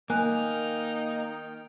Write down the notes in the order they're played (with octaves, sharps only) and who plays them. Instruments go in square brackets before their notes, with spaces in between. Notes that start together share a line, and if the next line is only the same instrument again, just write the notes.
[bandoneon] D#3 G5 F6 [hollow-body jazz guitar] A#3 [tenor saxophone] D#4 [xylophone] G#5 F#6